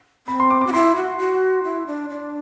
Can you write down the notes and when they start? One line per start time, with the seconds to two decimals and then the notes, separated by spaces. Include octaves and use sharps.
0.27 C4 B5
0.40 C6
0.50 D6
0.61 D6
0.67 F#4
0.73 E4 C6
0.96 F#4
1.18 F#4
1.64 E4
1.87 D4
2.10 D4